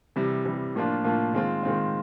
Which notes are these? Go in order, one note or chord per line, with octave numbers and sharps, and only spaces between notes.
C3 E3 G3
C3 E3 G3
A2 F3 A#3 D4 F4
A2 F3 A#3 D4 F4
D#3 G#3 C4 F4
D#3 G#3 C4 F4